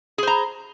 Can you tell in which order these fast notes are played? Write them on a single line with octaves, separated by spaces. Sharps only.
G#4 C5 A#5